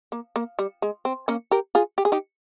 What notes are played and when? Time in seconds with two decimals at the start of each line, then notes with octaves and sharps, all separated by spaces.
0.12 A#3
0.36 A#3
0.59 G3
0.82 G#3
1.05 C4
1.28 A#3 C#4
1.51 G4 A#4
1.75 F4 G#4
1.98 G4
2.05 G#4
2.12 D#4 G4